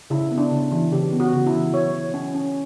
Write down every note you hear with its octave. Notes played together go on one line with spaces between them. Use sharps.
C#3 E4
B3
D4
C#3
E3
C#3 G4
B3
F#4
C#3
E4
E3
F#3 C#5
F#3
C#4
C#4